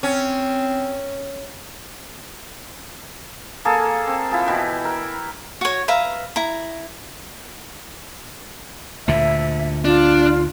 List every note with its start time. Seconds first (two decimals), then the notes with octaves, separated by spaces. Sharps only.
0.03 C4 C#4
3.65 A#3 G#4 A4
4.07 C4
4.31 E4 F4 G#4
4.46 B2 E3 B4 G5
4.85 A#4 G5
5.61 F#4 C#5
5.88 B4 E5 F5 A#5
6.36 E4 A#5
9.08 D2 A#2 D3 E5
9.85 D4 F4